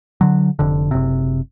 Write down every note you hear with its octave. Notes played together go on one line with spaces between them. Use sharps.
D3 F#3
F1 D3
F#1 C3